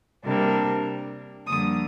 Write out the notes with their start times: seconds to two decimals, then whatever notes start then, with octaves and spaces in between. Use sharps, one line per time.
0.25 C3 G3 A#3 D4
1.47 F2 D3 G3 A#3 D#6